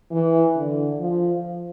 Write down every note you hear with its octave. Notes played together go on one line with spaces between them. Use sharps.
E3
D3
F3